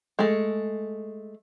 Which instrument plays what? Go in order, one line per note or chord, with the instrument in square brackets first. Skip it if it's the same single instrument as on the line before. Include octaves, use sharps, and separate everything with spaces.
[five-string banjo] G#3 A3